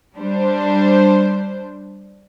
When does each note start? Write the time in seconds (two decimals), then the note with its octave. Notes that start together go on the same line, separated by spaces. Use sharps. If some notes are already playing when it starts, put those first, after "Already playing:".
0.17 G3 D4 C5